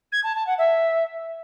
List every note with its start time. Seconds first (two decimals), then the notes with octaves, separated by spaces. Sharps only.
0.12 G#6
0.24 A5
0.35 A5
0.47 F#5
0.58 E5